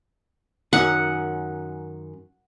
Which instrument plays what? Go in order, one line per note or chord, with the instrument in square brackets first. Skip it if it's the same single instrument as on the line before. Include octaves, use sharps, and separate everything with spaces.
[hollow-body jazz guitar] F#2 D#3 C#4 [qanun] F#5